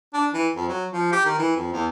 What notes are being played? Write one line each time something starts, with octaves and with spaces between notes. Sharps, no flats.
D4
E3
F2
F#3
F3
G4
D#3
E3
F2
E2